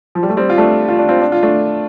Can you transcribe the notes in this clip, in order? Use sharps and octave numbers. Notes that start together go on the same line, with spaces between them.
F3
G3
A3
G3 C4
F4
A3 D4
F4
D4
C4 F4
D4
F4
A3 D4